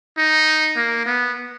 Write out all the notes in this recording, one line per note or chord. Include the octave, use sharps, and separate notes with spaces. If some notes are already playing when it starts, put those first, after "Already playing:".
D#4
A#3
B3